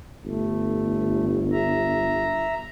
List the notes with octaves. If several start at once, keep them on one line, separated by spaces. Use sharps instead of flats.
G1 A3
E5 A#5